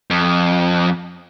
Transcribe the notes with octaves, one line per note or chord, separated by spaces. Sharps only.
F2